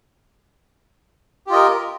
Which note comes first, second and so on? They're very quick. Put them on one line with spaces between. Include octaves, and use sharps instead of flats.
G4 F4 D#5 A#4